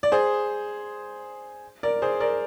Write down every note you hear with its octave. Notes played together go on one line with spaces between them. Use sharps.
D5
G#4 C5
A#4 D5
G#4 C5
A#4 D5